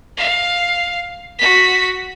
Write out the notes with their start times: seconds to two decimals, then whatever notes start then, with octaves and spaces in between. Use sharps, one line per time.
0.17 F5
1.39 F#4 B6